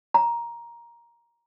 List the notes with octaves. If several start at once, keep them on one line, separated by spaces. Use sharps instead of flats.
A#5